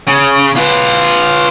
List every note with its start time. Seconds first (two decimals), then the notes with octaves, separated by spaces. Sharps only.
0.07 C#3
0.56 F4 B4